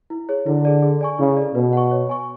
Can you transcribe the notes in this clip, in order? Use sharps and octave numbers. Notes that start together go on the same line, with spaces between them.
E4
G#4 C#5
D3 E4
G#4 D5
G#4
D5 G#5 C#6
C#3 E4
D5
A4
B2 B4
F#5 C#6
C#5
G#5 C#6